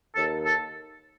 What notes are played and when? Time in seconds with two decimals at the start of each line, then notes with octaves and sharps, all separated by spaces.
0.15 D#2 A4
0.46 A4